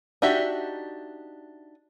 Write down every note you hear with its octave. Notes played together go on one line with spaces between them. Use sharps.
D4 D#4 F#4 G4 E5